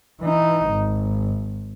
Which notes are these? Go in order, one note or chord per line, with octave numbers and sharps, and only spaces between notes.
E3 D#4
G#1